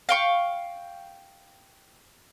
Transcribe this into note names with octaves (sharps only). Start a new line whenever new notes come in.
F5 G5 C#6